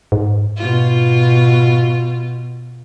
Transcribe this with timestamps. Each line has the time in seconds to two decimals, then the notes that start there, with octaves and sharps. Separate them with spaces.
0.12 G#2
0.56 B2 F4